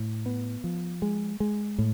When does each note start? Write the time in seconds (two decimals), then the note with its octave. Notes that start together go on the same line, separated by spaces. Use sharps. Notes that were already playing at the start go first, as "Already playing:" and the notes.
Already playing: A2
0.26 B3
0.64 F3
1.02 G#3
1.40 G#3
1.78 A2